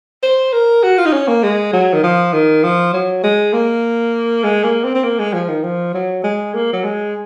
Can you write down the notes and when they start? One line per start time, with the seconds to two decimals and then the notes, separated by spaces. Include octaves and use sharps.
0.23 C5
0.53 A#4
0.83 F#4
0.98 F4
1.06 D#4
1.13 C#4
1.28 A#3
1.43 G#3
1.73 F#3
1.93 D#3
2.04 F3
2.33 D#3
2.64 F3
2.93 F#3
3.24 G#3
3.53 A#3
4.44 G#3
4.64 A#3
4.84 C4
4.95 C4
5.04 A#3
5.19 G#3
5.34 F3
5.49 D#3
5.64 F3
5.94 F#3
6.24 G#3
6.54 A#3
6.73 F#3
6.84 G#3